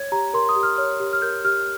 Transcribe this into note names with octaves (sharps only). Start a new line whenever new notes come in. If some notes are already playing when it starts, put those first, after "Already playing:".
Already playing: C#5 G#6
G4 A#5
A#4 C6
D#6
G4
F6
C#5 F6
G4
F6
A#4 G6
G4 F6